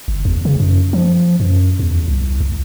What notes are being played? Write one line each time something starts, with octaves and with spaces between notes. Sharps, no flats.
G1
E2
C#3
F#2
F3
F#2
E2
C2
C2